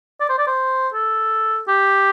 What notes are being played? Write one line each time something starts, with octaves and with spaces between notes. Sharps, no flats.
D5
C5
D5
C5
A4
G4